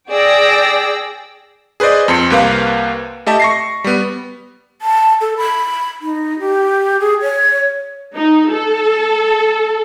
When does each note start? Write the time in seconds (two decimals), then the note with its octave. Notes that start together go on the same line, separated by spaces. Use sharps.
0.11 G#4 D5 G5 E6 A#6 D7
1.80 G#4 B4 C5 D5 D#5
2.08 F2 C4 C6 C#7
2.30 C2 C3 A#3 B4 F5
3.26 A3 G4 D#5 E5 A5
3.40 C#6 A#6 C7
3.84 G3 B3
4.82 A5
5.21 A4
5.37 B5
6.02 D#4
6.40 G4
7.00 G#4
7.22 C#5
8.15 D#4
8.52 A4